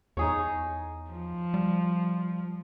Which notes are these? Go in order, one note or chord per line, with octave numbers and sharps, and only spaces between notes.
E2 D#4 G#4 C#5
F3
G3